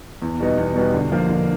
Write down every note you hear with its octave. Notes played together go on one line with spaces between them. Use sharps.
E2
B2 G3 B3 D#4
E2
B2 G3 B3 D#4
D3
F3 A#3
D3